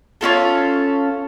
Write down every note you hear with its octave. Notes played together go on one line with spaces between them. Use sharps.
C#4 D#4 F4 A4